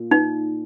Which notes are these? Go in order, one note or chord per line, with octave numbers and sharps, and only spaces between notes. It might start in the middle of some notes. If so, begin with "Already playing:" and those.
Already playing: A#2
D#4